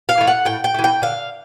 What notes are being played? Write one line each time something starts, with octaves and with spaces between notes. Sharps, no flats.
F5
E3 A3
F#5
A2 G5
G5
E3 A3
G5
D3 F5